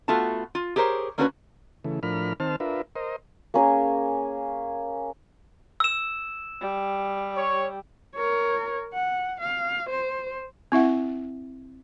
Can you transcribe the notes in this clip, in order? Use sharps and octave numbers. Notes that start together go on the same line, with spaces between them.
A3 B3 F4 F#4 A5
F4
G4 G#4 A#4 C5 C#5
A#3 C#4 D4 F#4 A4 B4
C#3 E3 A3
A2 F3 D4 A#4 B5 F6
D#3 C4 C5 A5 F6
D4 F4 A#4 B4 E5
A#4 C5 D#5
A#3 C#4 G#4 A#4
E6 E7
G3
C#5
A#4 C#5
F#5
F5
C5
C4 E4 E5 F#5